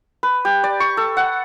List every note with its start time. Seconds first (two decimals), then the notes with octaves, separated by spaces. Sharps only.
0.23 B4
0.45 G4
0.64 D5
0.80 C#6
0.97 A4
1.17 F#5